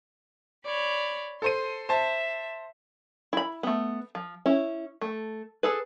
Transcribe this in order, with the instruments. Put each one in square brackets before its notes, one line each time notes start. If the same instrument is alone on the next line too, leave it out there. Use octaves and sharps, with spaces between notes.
[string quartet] C#5 D5 B5
[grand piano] A4 C5 D#7 [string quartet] C6
[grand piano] C5 A5 [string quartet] E5
[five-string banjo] E4 B5
A3 B3
F3
C#4 E4
A3
G#4 A4 B4